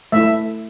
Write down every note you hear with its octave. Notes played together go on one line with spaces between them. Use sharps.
A3 E4 E5